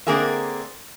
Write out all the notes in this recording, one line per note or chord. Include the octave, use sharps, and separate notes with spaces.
D3 A#3 C4 G#4 A#4 E5